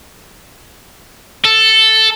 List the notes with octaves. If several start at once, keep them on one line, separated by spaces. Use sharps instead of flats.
A4